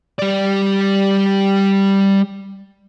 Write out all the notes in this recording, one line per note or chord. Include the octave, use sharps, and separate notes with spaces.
G3 D5